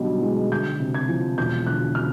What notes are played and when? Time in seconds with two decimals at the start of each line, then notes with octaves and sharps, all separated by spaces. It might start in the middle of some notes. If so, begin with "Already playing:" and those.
Already playing: B1 B2 D3 G3
0.22 G#3
0.51 D2 G6
0.80 C3
0.94 G#6
1.08 F3
1.37 E1 G6
1.67 D2 F#6
1.95 C#3 F6